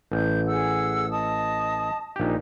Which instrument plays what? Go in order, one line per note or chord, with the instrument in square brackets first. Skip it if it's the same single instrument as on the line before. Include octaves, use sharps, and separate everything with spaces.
[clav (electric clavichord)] A1 [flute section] G6
[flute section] G#4 F#5 E6
D#5 A5 D#6
[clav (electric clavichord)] A#1 G4 [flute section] D#4